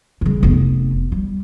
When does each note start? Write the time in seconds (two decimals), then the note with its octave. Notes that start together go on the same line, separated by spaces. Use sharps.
0.21 C#3 G3
0.43 F1 B3
1.12 G3